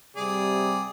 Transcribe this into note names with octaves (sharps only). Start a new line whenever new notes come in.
C3 G3 G#4 D5